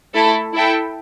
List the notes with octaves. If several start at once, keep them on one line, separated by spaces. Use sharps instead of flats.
A3 E4 A4
E4 A4 E5 G5